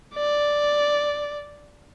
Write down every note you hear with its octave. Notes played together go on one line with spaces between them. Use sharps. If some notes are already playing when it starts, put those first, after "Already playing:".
D5